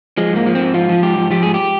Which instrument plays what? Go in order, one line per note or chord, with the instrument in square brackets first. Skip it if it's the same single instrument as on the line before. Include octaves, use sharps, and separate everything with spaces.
[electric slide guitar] F3 G#3
G#2 A#3
F3
G#2 C4
F3 F4
F3
G#2 G4
F3
F3 G4
G#2 G#4
G4